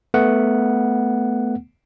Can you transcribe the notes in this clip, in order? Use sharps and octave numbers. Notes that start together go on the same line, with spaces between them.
A3 B3 F#5